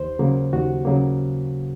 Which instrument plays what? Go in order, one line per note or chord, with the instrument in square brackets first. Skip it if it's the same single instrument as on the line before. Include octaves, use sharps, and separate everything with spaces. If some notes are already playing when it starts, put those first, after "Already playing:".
Already playing: [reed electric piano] D#2 C5
C#3 F#3 A#3
D#2 F#4
C#3 F#3 A#3